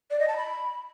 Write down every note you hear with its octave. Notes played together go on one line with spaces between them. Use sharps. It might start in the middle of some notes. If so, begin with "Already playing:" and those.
D5
D#5
A5
B5